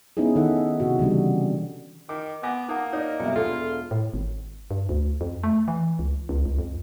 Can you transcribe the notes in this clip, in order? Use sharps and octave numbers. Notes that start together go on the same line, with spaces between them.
B3 C#4 D#4 E4 G#4
D#3 E4 A4 D#5 E5 F#5
C3 F#4
C#3 E3 G3 D4
D#3 D6
B3 G#5 D6 A#6
A#3 D#4 F#5 A5 D#6
D#4 B4 C#5 D5
B1 G2 C3 E5 G5
E1 F4 A4
A2
G#1
G2
D2
F2
A3
E3
C#2
C#2
C#2
F2